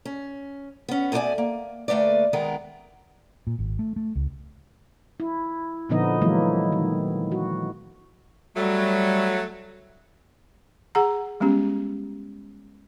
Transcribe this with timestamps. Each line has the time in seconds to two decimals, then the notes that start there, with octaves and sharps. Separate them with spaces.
0.05 C#4
0.88 B3 C#4
1.12 B2 A3 B3 A#4 D5 G#5
1.38 A#3
1.88 D2 A3 A#3 B4 D5
2.33 D#3 G#3 B3 A#4
3.47 A#2
3.59 G#1
3.79 A3
3.96 A3
4.15 C#2
5.20 E4
5.89 A#2 D3 F3 B3 D#4 D#5
6.21 E3 F#3 G#3 A#3 E4
6.72 D#3
7.32 F#4
8.57 F#3 G3 A3
10.95 G#4 F#5 A#5
11.40 G3 G#3 B3 C#4 G4